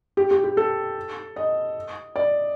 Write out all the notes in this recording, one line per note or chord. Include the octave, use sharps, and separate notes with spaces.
G4
G4
G4
A4
D#5
D5